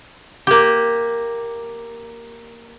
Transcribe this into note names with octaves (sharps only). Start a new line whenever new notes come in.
A#3 G4